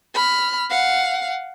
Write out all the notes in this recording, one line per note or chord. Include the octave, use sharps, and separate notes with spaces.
B5 F6
F5 F#5